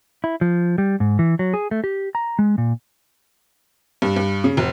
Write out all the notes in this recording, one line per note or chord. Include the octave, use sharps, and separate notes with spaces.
E4
F3
G3
G#2
E3
F#3
G#4
A3
G4
A#5
G#3
A#2
G2
G2
C#3
F1